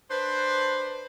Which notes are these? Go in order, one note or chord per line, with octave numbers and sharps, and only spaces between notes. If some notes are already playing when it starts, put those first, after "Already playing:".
D4 B4 C5